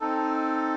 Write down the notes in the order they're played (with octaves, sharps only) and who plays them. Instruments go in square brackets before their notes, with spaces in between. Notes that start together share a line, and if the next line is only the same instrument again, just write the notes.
[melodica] C4 D#4 A4